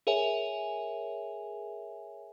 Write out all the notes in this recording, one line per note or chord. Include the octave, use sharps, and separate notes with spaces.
G#4 A#4 C#5 E5 G#5